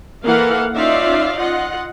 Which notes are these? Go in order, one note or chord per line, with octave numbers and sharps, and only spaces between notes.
E3 A#3 A4 A#4 F5 F#5
C#4 D#4 F4 D5 E5 F5
F4 D#5 F#5